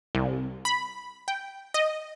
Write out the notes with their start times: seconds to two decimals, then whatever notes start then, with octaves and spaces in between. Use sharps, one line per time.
0.15 C2
0.65 B5
1.28 G5
1.74 D#5